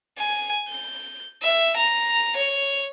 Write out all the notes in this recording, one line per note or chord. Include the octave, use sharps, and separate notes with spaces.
G#5
G6
E5
A#5
C#5